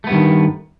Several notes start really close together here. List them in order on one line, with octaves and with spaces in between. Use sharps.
A3 B3 G2 D#3